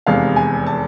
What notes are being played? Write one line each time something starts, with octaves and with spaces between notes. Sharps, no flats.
F1 E2 C3 G#3 F5
G#5
A5